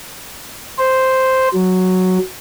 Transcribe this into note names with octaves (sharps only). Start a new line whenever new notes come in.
C5
F#3